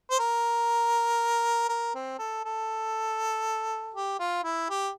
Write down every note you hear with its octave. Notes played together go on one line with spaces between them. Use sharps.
C5
A#4
A#4
C4
A4
A4
G4
F4
E4
G4